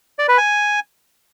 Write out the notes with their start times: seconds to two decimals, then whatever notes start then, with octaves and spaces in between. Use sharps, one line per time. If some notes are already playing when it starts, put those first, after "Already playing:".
0.19 D5
0.28 B4
0.38 G#5